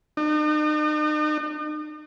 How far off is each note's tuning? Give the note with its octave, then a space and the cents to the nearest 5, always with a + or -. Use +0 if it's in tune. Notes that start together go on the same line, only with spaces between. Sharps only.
D#4 -40